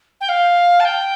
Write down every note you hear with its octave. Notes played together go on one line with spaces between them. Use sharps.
G5
F5
A5
G5